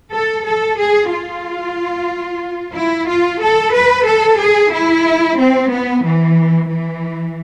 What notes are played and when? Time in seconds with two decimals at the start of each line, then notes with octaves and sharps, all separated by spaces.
0.13 A4
0.45 A4
0.78 G#4
1.11 F4
2.75 E4
3.08 F4
3.41 A4
3.74 B4
4.07 A4
4.39 G#4
4.72 E4
5.38 C4
5.70 B3
6.03 E3
6.69 E3